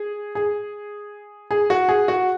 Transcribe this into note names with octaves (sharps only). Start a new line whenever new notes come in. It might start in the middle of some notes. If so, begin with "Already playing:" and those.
Already playing: G#4
G#4
G#4
F#4
G#4
F#4